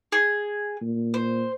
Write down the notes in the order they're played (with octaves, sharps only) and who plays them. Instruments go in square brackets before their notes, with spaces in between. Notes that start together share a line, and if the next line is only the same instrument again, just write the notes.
[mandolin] G#4
[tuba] A#2
[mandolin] C5